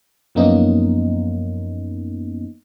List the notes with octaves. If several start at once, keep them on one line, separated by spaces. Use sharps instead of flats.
F#2 F3 A#3 B3 C#4 D#4